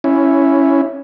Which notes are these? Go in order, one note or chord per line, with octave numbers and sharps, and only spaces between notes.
C#4 E4